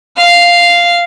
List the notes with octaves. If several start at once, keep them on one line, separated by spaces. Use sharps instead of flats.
F5